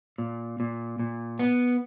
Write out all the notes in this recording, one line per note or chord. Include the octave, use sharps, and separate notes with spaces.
A#2
A#2
A#2
B3